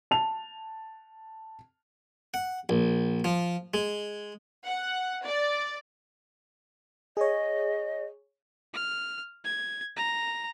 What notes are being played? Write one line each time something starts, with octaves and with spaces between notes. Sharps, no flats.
A5 F7
F#5
A#1
F3
G#3
F#5
D5
G#4 C#5 D#5
F6
G#6
A#5